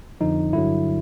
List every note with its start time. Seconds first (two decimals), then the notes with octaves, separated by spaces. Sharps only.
0.20 F2 D3 F3 D#4
0.53 G2 D3 F#3 E4